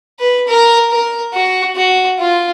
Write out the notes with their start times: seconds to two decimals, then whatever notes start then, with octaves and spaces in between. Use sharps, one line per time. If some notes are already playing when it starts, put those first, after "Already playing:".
0.19 B4
0.47 A#4
0.90 A#4
1.33 F#4
1.76 F#4
2.19 F4